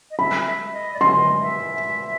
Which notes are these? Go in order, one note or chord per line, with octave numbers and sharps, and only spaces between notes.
D#5
E5 B5
E5
D#5
D5
D#5 C6
E5